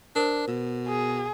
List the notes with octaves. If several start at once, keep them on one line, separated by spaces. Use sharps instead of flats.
D4 A#4 C5
B2
G#4